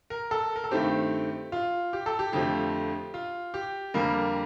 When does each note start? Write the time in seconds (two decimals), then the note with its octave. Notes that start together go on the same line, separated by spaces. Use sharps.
0.10 A#4
0.31 A4
0.56 A#4
0.64 A4
0.71 G2 D#3 A3 C4 G4
1.52 F4
1.93 G4
2.06 A4
2.19 G4
2.33 F2 D3 F3 A3 G4
3.14 F4
3.54 G4
3.94 F2 D3 G3 A#3 A#4